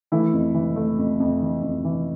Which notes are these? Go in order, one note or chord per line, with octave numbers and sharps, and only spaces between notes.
E3 A3 E4
F2
E3
A3
F2
F2
E3
F2
E3